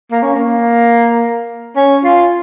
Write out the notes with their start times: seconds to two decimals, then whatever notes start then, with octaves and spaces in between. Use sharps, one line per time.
0.11 A#3
0.23 C#4
0.36 A#3
1.76 C#4
2.04 F4